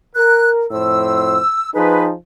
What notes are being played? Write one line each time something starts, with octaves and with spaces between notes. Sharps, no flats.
A#4 F#6
F2 A2 C5 E6
F3 D#4 G#4 B4